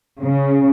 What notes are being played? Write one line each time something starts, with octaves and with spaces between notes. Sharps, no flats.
C#3